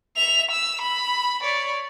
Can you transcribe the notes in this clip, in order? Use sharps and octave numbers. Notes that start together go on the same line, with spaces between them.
E5 F7
E6
B5
C#5 D5